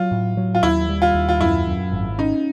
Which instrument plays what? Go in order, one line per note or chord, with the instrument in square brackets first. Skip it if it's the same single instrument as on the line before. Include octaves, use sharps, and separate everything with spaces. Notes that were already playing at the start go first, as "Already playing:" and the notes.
Already playing: [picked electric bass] F#3 [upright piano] F4
[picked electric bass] A2
F#3
[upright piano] F4
[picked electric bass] D#2 [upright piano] E4
[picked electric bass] G3
[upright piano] F4
[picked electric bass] D#2
[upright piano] F4
[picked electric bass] F#2 [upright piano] E4
[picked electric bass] F#2
G#1
[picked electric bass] C#4 [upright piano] D#4